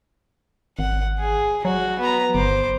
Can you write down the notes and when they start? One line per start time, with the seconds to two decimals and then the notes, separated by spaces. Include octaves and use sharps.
0.79 G#1 F#5
1.20 G#4
1.65 F#3 F#4
2.00 B3 A#5
2.35 G1 C5 D6